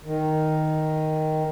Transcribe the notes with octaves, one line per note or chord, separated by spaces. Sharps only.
D#3